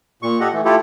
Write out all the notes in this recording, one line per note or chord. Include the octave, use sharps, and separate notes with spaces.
A#2 C#6
G4 A4 D#5 F#5
E3 A3
A3 E4 F4 G4 A4